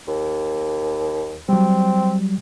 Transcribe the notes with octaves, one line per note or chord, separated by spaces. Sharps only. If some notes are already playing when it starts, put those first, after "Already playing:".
D#2
F#3 G3 C4